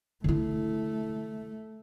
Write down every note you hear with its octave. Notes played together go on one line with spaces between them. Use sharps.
D3 A3 E4